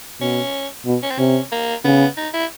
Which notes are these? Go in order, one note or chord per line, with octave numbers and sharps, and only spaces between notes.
B2 C#4
B2
C#4
C4
C3 C#4
A#3
C#3 B3
D#4
E4